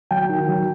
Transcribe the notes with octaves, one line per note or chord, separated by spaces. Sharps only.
F#3 G5
D#3
F#3